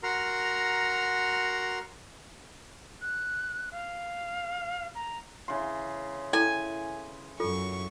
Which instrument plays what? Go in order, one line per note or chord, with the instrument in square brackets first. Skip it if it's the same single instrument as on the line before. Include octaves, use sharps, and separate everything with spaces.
[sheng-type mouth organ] F#4 A#4 A#5 C6
[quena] F#6
F5
A#5
[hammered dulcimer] C#3 E3 C6
[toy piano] E4 A4 [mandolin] G#5
[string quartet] F#2 C#6 [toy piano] F4 A4